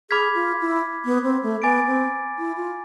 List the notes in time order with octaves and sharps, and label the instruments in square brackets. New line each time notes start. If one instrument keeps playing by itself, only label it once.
[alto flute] G#4 [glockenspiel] B5 D6 F6 G#6 B6
[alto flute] F4
E4
B3
C4
A3
[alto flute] B3 [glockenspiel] G#5 D6 A6 D7
[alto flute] C4
E4
F4